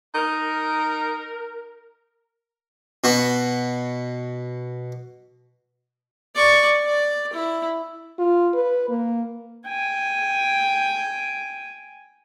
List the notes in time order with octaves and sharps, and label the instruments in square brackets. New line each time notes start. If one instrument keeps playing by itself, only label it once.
[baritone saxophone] D#4 [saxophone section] A#4
[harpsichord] B2 F#4
[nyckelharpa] D5 C#6
D5
E4
[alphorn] F4
B4
A#3
[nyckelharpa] G5 G#5